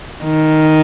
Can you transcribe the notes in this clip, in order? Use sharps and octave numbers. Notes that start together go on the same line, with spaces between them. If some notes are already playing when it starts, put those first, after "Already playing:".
D#3